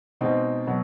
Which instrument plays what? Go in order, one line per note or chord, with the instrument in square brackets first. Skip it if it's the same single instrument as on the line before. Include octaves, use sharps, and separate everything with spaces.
[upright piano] B2 G#3 C4 D#4
B2 F#3